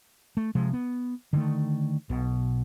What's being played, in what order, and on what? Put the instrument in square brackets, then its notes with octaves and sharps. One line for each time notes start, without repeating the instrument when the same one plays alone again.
[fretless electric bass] A3
C3 F3 G#3
B3
D3 D#3 A3
B1 B2